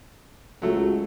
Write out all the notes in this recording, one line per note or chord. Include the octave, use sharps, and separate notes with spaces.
C#2 F#3 A3